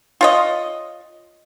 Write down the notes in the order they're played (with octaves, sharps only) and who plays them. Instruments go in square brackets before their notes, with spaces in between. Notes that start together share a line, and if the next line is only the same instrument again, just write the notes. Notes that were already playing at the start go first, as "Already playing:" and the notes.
[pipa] F4 C#5 D#5